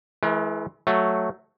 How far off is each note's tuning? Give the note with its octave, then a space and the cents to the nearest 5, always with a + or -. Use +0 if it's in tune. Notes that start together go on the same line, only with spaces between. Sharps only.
E3 +0 G#3 +45 A#4 +35
F#3 +0 A3 +0